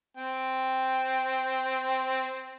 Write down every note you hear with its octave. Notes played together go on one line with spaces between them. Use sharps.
C4 G5